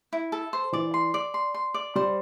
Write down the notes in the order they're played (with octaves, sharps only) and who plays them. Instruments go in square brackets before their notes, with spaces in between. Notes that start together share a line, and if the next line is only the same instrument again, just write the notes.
[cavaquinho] E4
A4
C5
[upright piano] E3 [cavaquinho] D5
[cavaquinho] C6
D5
C6
C6
D5
[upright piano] G3 [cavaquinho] C5